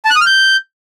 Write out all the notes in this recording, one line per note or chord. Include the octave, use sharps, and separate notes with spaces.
A5
F#6
D#6
F6
G6